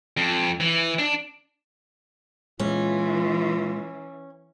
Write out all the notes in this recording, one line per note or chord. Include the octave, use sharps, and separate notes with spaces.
F2
E3
D4
A#2 E3 G#3 C#4 F4